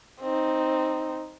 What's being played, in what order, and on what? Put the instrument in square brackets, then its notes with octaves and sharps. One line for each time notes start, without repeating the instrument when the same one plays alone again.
[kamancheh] C4 D#4